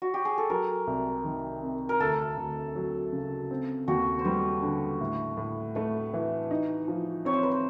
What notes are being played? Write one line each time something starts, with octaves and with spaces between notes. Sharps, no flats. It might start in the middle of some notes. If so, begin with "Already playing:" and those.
F#4
G4
G#4
A4
F#3 A#4
C2
D#3
C3
A#4
D2 A4
D2
F#3
C#3
C4
D#2 F#4
C5
G3 B4
D3
A2
A2
A3 B4
E3
D#4
F3
C4 C#5
C5
B4
C5